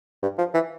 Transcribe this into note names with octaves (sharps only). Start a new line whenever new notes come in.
G2
F3
E3